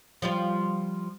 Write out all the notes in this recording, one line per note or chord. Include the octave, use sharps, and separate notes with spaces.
F3 G3 F4